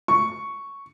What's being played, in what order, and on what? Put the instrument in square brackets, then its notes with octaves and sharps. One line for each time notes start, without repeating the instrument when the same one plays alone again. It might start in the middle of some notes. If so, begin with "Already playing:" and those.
[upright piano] C#6